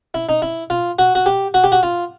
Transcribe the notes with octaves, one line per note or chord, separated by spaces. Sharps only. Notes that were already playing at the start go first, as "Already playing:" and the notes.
E4
D#4
E4
F4
F#4
F#4
G4
F#4
G4
F#4
F4